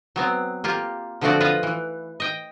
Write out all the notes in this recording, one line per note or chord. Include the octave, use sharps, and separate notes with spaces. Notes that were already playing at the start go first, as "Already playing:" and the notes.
F#3 B3 C4
A#3 F4 G4
D3 F3 A3 C4 F#4 D5
F4 B4 D#5
E3
D#5 G5